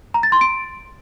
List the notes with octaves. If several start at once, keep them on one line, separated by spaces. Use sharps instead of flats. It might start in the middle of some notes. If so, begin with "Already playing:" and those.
A#5
A6
C6
D7